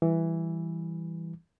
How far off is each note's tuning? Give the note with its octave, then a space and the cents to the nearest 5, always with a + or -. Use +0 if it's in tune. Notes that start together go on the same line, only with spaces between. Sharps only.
E3 +0 G3 +0